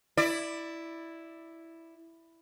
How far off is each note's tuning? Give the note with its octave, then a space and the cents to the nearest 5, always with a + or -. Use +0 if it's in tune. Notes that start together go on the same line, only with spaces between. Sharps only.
E4 +0 D5 +15